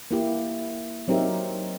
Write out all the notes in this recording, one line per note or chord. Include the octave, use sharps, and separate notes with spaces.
A#3 E4 G4
F#3 C4 D#4 G4 A#4 E5